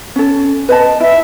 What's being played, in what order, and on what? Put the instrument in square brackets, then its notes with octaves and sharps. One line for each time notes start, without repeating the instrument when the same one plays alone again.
[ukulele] C#4 A4
B4 D#5 A5
[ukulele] E4 [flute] E5